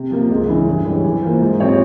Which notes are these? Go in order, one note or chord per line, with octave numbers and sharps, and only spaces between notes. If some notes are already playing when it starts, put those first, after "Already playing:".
Already playing: C3
F3 A#3 F4
C#2
C#3 E3 G#3 E4
G2
E3 G#3 C#4 G4
E3
A#3 F4 C5
G#2
F3 C4 G4 C#5